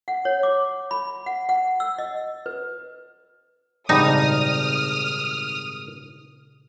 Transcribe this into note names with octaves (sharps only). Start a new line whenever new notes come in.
F#5
C#5
D6
B5
F#5
F#5
E6
D#5
B4
G#1 A#2 C#3 G3 D#4 A5 D#6 F6